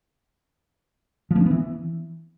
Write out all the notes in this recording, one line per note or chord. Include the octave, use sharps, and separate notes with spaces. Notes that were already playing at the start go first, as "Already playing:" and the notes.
F3
A#3
C#4
B3
E3